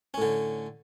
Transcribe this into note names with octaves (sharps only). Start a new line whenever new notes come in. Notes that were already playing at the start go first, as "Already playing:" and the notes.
A2 D3 C#4